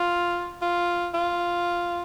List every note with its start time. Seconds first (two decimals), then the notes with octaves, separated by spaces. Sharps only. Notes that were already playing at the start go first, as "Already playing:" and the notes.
Already playing: F4
0.62 F4
1.14 F4